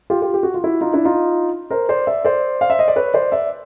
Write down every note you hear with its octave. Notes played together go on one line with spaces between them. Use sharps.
F4 G4
F4 G4
G4
F#4
F4
E4 F#4
D#4 F4
D4 E4
D#4 F4
A#4 C5
C5 D5
D5 E5
C5 D5
F5
E5
D#5
D5
B4 C#5
C5 D5
D5 E5